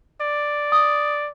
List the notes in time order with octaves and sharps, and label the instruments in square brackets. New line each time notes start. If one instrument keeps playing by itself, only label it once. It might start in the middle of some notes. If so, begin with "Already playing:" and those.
[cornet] D5
[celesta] D#6